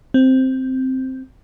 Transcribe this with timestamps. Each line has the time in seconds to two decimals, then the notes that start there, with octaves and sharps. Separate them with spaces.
0.14 C4